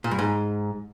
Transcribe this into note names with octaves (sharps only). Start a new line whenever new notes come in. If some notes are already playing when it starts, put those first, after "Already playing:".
A#2
G2
G#2